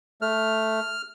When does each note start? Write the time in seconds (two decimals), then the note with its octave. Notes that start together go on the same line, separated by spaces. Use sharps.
0.21 A3 F6